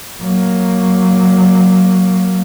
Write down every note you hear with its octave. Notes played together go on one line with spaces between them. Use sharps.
F#3 A#3